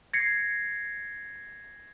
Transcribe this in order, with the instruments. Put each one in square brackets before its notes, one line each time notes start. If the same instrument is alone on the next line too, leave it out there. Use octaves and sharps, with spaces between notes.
[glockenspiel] G#6 A#6 C7 C#7